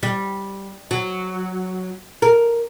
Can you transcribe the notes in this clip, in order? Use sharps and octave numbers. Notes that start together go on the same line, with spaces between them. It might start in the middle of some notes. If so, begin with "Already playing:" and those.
G3
F#3
A#4